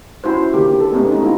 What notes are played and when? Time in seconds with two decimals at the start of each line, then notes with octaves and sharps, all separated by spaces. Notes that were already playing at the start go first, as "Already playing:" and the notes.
0.24 C#4 E4 F#4 C5
0.53 D3 A#3 G4
0.80 A4
0.92 G#3 A3 B3 C#4 D#4 G4
1.11 C4 D#4
1.23 A3 B3 E4 F4